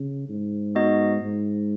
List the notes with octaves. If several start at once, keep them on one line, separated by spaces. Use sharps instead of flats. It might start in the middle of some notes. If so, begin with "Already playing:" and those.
Already playing: C#3
G#2
B3 D#4 F#4 D#5
G#2